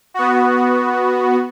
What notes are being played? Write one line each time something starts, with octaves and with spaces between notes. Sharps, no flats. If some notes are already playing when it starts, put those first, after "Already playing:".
B3 F#4